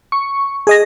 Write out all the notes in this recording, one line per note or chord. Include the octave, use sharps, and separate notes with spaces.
C#6
G#4 D#5 A#6